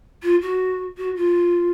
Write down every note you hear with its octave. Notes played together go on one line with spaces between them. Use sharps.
F4
F#4
F#4
F4